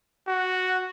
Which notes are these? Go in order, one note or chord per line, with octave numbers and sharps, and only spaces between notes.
F#4